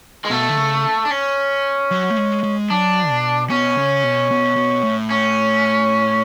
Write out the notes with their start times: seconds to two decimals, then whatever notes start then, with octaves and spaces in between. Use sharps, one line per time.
0.25 G#3
0.30 B2 A3
0.49 D3
0.57 C#3
1.05 D4
1.10 C#4
1.91 F#3
2.10 A3
2.18 G#3
2.43 G#3
2.70 F#3 D4
3.10 B2
3.50 B2 C#4
3.78 C#3
4.04 B2
4.31 B2
4.56 B2
4.83 A2
5.11 C#4